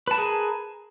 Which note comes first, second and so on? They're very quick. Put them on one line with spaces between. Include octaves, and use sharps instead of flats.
B4 A5 A#4 G#4